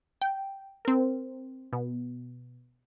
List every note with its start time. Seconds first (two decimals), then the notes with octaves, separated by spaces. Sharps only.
0.22 G5
0.85 C4 A#4
1.73 B2